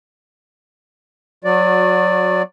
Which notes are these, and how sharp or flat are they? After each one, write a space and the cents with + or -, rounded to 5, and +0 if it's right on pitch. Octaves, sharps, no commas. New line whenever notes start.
F#3 -20 F#4 -30 D5 +0